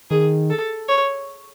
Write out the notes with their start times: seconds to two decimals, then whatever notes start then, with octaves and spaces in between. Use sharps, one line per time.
0.10 D#3 G#4
0.50 A4
0.88 C#5